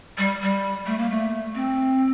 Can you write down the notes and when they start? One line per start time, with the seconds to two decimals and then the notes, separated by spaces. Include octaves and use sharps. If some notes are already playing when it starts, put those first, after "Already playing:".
0.18 G3
0.42 G3
0.86 A3
0.98 A#3
1.10 A3
1.55 C4